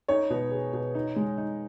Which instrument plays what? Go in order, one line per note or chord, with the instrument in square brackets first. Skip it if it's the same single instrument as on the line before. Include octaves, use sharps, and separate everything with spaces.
[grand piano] D#4 [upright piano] C#5
[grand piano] B2
G#4
B2
D#4
G#3
D#4